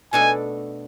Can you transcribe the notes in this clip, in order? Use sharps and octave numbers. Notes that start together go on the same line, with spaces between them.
B2 A3 D4 A4 G#5